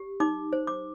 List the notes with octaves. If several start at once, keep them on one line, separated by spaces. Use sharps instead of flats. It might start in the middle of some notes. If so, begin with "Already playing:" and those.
Already playing: G4
D#4 D6
C5
D6